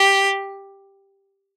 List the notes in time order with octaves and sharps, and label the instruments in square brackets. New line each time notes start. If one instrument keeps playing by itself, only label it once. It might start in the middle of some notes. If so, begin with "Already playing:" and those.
Already playing: [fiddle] G4